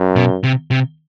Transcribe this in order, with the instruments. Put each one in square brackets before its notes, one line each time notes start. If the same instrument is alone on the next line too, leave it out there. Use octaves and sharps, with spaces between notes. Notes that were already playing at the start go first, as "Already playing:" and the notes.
Already playing: [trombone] F#2
[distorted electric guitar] B2
C3
C3